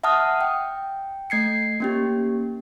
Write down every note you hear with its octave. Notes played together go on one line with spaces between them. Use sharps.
E5 F#5 A5 D#6 F6
G5
A3 G#6 C7 C#7
A#3 C#4 G4